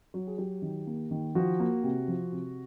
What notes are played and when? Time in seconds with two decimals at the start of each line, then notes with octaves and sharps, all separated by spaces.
0.14 F#3
0.27 G#4
0.38 F#3 G4
0.62 D#3
0.87 A#3
1.11 D#3
1.35 F3 F#4
1.60 A#3
1.83 C3
2.08 F3
2.32 C3